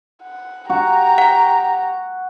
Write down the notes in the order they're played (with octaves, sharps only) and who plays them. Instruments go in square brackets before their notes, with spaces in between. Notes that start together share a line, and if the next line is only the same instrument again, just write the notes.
[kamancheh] F#5
[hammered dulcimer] F#4 [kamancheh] G4 A#5
[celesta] F#5